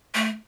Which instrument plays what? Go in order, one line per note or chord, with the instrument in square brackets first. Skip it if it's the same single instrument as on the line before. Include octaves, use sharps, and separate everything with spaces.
[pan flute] A3